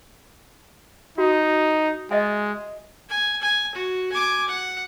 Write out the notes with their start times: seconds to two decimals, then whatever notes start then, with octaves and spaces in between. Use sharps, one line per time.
1.18 D#4 F#4
2.11 G#3 D#5 E5 G#5
3.09 G#5
3.41 G#5
3.74 F#4
4.12 G#5 D6
4.48 F#5